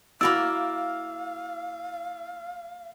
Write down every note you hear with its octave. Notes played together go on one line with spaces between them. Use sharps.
A#3 E4 F#4 A#4 D5 F5 B5 E6